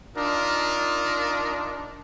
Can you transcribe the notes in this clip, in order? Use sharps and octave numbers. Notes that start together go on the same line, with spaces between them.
D4 D#4 F4 A#4